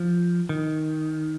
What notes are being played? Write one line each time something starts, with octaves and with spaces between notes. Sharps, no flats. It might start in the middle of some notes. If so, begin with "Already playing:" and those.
Already playing: F3
D#3